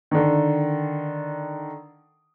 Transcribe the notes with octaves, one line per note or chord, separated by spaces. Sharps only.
D3 D#3